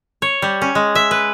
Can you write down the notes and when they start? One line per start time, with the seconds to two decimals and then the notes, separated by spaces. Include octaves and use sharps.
0.22 C#5
0.42 G3
0.62 C#4
0.75 G#3
0.95 E5
1.11 B4